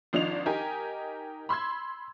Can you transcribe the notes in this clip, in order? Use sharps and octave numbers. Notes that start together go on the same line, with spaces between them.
G#1 F3 D4 D#4 F7
D#4 G4 A#4 G#5
B5 C6 E6 G#6